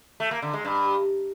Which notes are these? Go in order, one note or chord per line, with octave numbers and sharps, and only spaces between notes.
A3
A#3
D3
G#3
G2